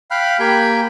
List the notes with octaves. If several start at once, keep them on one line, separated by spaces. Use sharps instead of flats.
F5 G5 B5 F6 F#6
A#3 G4 G5 G#5 B5 G6